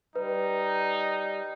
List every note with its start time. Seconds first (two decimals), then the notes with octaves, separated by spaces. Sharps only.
0.16 G3 D#4 B4